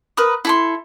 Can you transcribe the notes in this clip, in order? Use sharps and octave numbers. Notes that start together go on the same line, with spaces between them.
A#4 B4 B5 D#6
E4 A4 C6